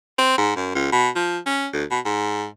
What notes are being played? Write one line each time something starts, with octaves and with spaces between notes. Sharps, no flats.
C4
G#2
F#2
C#2
B2
F3
C#4
D2
B2
G#2